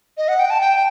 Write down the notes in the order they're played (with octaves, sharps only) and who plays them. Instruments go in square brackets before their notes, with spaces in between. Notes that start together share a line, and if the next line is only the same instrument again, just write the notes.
[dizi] D#5
F#5
G5
A5
G5